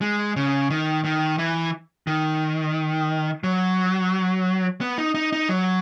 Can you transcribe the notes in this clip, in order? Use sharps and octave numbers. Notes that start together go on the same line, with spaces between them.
G#3
C#3
D#3
D#3
E3
D#3
F#3
B3
D#4
D#4
D#4
F#3